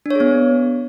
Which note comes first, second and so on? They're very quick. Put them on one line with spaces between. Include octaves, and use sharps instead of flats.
D4 C#5 G#4 B3